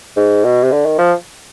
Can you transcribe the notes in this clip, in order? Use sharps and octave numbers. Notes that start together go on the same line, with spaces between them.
G#2
B2
C3
D3
D#3
F3